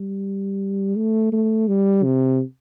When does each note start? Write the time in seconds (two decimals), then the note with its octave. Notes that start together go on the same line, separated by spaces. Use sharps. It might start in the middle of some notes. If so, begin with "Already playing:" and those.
Already playing: G3
0.96 A3
1.32 A3
1.68 G3
2.04 C3